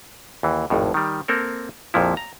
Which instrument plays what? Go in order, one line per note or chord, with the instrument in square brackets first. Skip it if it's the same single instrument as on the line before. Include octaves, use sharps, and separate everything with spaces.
[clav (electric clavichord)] D#2 E3
G#1 F2 A2
D#3 G3
A#3 C4 A4 A#4
A#1 F2 A#2 F3 E4
A#5